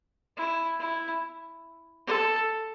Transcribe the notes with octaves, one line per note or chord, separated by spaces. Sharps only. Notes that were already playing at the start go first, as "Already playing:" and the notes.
E4
E4
A4